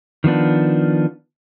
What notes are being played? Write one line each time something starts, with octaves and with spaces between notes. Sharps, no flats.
D#3 F3 B3 D4